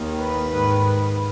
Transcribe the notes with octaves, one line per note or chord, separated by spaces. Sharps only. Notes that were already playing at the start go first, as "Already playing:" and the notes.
Already playing: D#2 D#3
B4
G#2 D#3